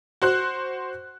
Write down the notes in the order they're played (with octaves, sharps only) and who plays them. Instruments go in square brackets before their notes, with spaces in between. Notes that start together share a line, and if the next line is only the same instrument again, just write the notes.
[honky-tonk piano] F#4 C5 F#6